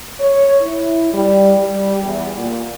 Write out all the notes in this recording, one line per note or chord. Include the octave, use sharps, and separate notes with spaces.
C#5
E4
G3
G3
E2
A#2